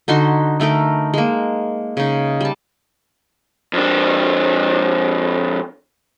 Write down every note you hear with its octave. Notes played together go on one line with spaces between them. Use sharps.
D3 D#4 F#4 C6
D3 A3 D#4 A#4
G#3 A#3
C#3 D#4
G3 A5
F2 D4